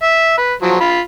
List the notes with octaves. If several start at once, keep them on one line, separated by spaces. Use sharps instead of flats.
E5
B4
F3 F#3 C5
F4 B5